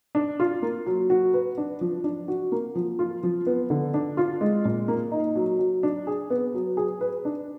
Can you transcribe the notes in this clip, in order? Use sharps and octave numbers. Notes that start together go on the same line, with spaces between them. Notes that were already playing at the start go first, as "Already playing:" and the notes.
D4
F4
A#3
F#3
F#4
B4
D4
F3
D4
F#4
A#3
F3
F4
F3
B3
D3
D4
F4
G#3
A#2
A#3
D#4
F#3
F#3
D4
G#4
B3
F#3
G#4
B4
D4